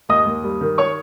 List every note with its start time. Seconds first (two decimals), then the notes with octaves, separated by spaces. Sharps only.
0.09 D#2 D#5 D#6
0.26 D#2
0.44 G3
0.61 D#3
0.78 C#5 C#6